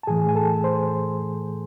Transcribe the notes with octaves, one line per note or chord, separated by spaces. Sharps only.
A5
A2 E3 A3 G#4 G#5
G#5
A4 A5
C5 C6